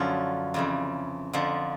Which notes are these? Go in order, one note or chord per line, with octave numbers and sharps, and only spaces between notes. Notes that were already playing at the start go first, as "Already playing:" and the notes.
Already playing: F#2 D3 F3 C#4
F2 C#3 E3
F2 D3 F3